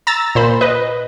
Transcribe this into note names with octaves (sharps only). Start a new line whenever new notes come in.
A#5 E6 A6
A#2 C5 B5
B4 D#5